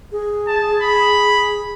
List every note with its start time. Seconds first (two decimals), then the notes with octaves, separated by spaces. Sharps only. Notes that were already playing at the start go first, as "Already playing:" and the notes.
0.12 G#4
0.47 A5
0.82 B5